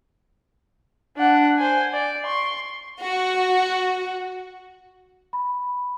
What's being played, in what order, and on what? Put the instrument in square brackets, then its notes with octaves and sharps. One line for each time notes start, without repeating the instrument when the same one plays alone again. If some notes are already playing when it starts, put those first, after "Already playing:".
[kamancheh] D4 F#5
C5 G#5
D5
C6 C#6
[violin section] F#4
[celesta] B5